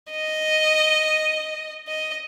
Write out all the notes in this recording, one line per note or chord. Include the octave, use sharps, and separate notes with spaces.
D#5
D#5